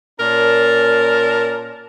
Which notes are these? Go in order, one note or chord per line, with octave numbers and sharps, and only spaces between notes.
A#2 C#4 A#4 D5 A5